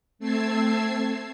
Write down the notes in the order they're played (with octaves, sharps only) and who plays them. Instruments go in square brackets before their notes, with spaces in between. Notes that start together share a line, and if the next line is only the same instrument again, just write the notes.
[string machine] A3 C4 A5 E6 G#6 C7